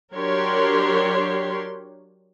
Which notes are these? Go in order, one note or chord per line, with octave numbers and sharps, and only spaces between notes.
F#3 D4 G4 A#4 C#5 C6